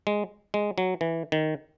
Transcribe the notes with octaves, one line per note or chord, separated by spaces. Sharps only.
G#3
G#3
F#3
E3
D#3